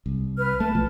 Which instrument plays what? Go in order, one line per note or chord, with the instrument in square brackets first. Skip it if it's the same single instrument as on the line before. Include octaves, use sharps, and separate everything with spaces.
[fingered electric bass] C2
[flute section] B4 F6
[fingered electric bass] A3 [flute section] A5
[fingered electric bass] B1 B2 F3